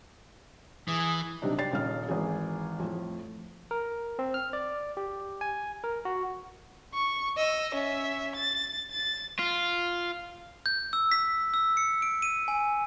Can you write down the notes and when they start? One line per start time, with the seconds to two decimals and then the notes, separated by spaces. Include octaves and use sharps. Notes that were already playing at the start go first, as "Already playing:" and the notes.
0.88 E3 G#4
1.42 B1 C3 G3 D4 D#4
1.58 G4 D5 G5 A6 C7
1.72 D#1 C#3 D#4 F6
2.08 G#1 E3 G#4
2.79 F2 A2
3.71 A#4
4.19 C4
4.34 F6
4.53 D5
4.97 G4
5.41 G#5
5.84 A#4
6.05 F#4
6.94 C#6
7.37 D#5 E6
7.74 C#4 E5
8.36 A6
8.91 A6
9.39 F4
10.66 G6
10.93 E6
11.12 B6
11.54 E6
11.77 C#7
12.02 D7
12.22 D#7
12.48 G#5